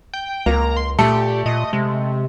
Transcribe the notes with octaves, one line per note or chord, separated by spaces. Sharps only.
G5
C#2 A#3 A#5
C6
A#2 A3 G4 A4
A#2 D#5
C3 G#3